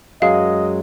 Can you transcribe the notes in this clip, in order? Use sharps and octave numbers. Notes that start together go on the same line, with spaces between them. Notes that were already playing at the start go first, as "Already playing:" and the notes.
F#2 F#3 G#3 D#5 F5